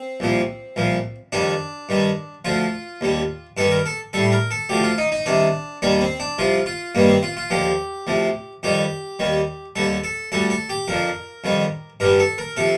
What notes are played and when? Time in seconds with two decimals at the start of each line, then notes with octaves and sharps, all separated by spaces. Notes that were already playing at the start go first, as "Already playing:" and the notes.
Already playing: C4
0.20 C2 A#2 F3
0.76 C2 A#2 F3
1.32 F2 D#3 G3 D4
1.89 G2 D#3 G3
2.45 D2 D3 F3 F4
3.01 D#2 D3 G3
3.57 G2 D#3 G3 A4
3.71 A#4
3.86 A4
4.13 A2 G3 A4
4.32 A#4
4.51 A4
4.69 D2 D3 F3 G4
4.84 F4
4.98 D#4
5.12 D#4
5.26 C2 C3 D#3 D4
5.82 D#2 D#3 G3 D4
6.01 C4
6.20 D4
6.38 C2 C3 F3 F4
6.66 F4
6.95 G2 D#3 G3 A#3
7.09 C4
7.23 F4
7.37 F4
7.50 D#2 D3 F3 G4
8.07 D2 C3 F3
8.63 F2 D#3 G3 G4
9.19 D#2 D#3 G3
9.76 D#2 D3 G3 A4
10.04 A4
10.32 D2 D3 G3 A4
10.50 A4
10.69 G4
10.88 F2 D3 F3 A#4
11.44 F2 D#3 G3
12.00 G2 D3 G3 A#4
12.19 A4
12.38 A#4
12.57 C3 F3 A4